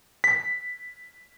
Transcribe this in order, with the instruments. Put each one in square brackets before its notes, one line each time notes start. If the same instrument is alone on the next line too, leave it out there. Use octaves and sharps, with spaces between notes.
[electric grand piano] B6